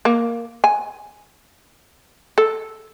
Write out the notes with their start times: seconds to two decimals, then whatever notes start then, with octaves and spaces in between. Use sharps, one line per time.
0.05 A#3
0.64 G#5
2.38 A4